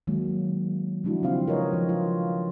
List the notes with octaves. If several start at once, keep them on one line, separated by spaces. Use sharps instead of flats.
D#3 F#3 G#3 A#3
F3 G#3 D4 E4 F#4
C#3 C4 F4 F5
A#4 B4 C#5 D#5
F3
F4